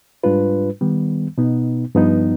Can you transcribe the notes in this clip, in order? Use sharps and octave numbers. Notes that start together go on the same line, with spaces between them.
G#2 G3 D4 F4 B4
D#3 G3 B3
B2 B3 D#4
G2 F3 B3 D#4